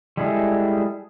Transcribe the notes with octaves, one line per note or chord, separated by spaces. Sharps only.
G3 G#3 E4 G#4 A4